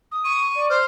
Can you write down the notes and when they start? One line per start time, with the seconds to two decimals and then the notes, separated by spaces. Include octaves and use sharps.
0.11 D#6
0.24 C#6 D#7
0.55 D5
0.70 C5 F6